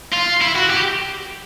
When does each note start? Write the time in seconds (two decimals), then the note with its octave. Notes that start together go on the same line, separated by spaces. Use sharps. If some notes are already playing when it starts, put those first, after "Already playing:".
0.13 F4
0.42 E4
0.56 F#4
0.70 G4